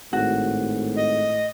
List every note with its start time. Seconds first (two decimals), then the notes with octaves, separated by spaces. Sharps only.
0.13 G#1 A2 F#4
0.96 D#5